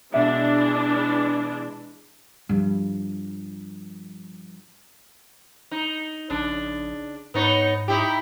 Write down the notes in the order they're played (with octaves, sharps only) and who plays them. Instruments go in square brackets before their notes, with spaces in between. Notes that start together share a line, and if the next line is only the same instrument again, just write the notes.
[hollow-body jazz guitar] B2 E5 [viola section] E3 G#3 D4
[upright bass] G2 F3
[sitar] D#4
[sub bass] A#1 [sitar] C#3 D4
[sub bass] G#2 [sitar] B3 D#4 C#5
[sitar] D#4 E4 G4